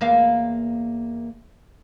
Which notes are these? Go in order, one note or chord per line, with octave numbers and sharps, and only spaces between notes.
E2 A#3 F5